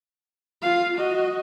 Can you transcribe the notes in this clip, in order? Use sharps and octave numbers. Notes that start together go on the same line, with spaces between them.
F4 F5
F#4 D#5